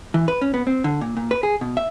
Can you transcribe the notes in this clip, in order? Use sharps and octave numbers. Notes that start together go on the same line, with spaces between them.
E3
B4
C#4
B3
C4
D3
A#2
A#2
B4
G#4
B2
E5